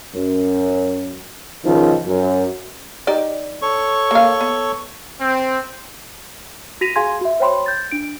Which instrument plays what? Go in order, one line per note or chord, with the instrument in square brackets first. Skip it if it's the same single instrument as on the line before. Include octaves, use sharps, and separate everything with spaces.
[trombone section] F#2
C#2 D#3 F3
F#2
[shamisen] D#4 G4 D5
[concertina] A4 C#5 C#6
[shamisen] A#3 F5
B3
[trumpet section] C4
[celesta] F#4 A#6 B6 D#7 F7
F#4 G#4 F5 G#5 C6 G#6
F#4 E5
C5 C#5 G5 B5 C6
G6 A6
D4 D7